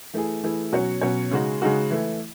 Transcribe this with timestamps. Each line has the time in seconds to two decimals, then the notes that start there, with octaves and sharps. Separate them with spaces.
0.14 E3 A3 E4 G#4
0.43 E3 A3 E4 G#4
0.72 B2 F#3 C#4 F#4 C#5
1.01 B2 F#3 C#4 F#4 C#5
1.31 C#3 G#3 D#4 F#4
1.62 C#3 G#3 D#4 F#4
1.91 E3 A3 E4